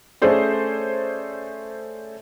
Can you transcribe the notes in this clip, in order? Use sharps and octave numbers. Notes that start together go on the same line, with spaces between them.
A3 C#4 G#4 A4 C5 D5